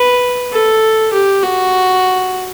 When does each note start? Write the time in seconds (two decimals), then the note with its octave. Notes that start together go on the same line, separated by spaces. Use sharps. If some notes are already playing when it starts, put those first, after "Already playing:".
Already playing: B4
0.52 A4
1.13 G4
1.43 F#4